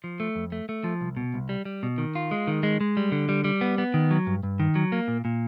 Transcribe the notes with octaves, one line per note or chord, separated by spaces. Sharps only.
F3
A3
F2
A3
A3
F3
C2
B2
C2
G3
G3
B2
D#3
F4
G#3
D#3
G#3
G#3
G3
D3
G3
G3
B3
B3
D#3
F#3
G2
G2
D#3
F#3
A#3
A#2
A#2